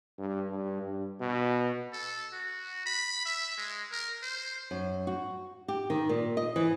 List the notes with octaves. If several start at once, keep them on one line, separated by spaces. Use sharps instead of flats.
G2
G2
G2
B2
A4
F#4
B5
E5
G#3
A#4
C5
F#2
F#4
G4
D#3
A#2
D#5
E3